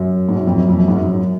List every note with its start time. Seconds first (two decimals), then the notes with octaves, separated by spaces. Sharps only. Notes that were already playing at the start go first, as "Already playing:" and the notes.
Already playing: F#2
0.29 G#2
0.36 F#2
0.47 F2
0.58 F#2
0.69 F2
0.79 F#2
0.88 G#2
0.96 F#2